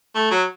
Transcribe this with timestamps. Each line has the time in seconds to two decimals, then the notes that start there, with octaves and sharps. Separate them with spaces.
0.15 A3
0.31 F#3